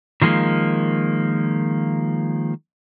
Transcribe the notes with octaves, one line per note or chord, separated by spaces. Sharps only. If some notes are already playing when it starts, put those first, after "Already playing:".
D#3 F3 G#3 A#3